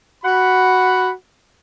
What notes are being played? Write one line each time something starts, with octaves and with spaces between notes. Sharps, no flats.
F#4 F#5 B5